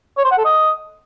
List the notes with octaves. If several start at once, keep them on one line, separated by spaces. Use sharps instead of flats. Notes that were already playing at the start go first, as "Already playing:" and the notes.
C#5
C5
F#5
A4
D#5